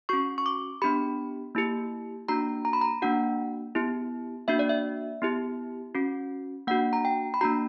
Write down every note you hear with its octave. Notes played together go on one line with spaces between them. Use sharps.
C#4 F#4 C#6
C#6
D6
B3 D4 G4 B5
A#3 E4 G4
A#3 D4 F#4 A#5
A#5
B5
A#5
A#3 D4 F#4 F#5
B3 E4 G4
A#3 D4 F#4 E5
D5
E5
B3 E4 G4
C#4 F#4
A#3 D4 F#4 F#5
A#5
G5
B5
A#3 D4 F#4 A#5